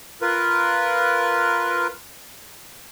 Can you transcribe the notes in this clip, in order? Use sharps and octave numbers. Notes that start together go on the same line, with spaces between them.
F4 A#4 B4